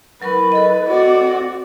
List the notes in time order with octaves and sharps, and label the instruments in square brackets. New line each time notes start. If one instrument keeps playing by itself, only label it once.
[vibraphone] F#3 A#4 C#6 [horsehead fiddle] E4 B4
[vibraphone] A4 D#5
[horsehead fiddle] C4 D5 [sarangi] F#4